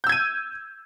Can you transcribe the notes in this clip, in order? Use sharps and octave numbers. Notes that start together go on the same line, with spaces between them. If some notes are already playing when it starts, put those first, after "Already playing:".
E6 G6 G#6 D#7